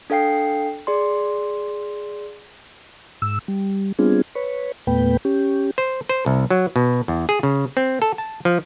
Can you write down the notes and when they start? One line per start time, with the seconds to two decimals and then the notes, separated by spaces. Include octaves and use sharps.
0.10 D4 A4 F5 G5 C7
0.87 G#4 D5 C6
3.22 G#2 E6
3.48 G3
3.99 G3 B3 C4 D4 F4 G#4
4.35 B4 C#5
4.87 E2 A#2 A3 B3 B4 G5
5.25 C#4 G4
5.78 C5
6.09 C5
6.26 C2
6.50 F#3
6.76 B2
7.08 E2
7.29 G#4
7.43 C#3
7.77 C4
8.02 A4
8.18 A5
8.45 F3